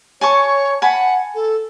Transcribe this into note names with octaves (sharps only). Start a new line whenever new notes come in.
C#5 G#5 A5 C#6
F#5 G#5 A5 B5
A4